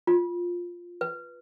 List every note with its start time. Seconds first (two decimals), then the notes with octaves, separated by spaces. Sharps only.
0.07 F4
1.01 B4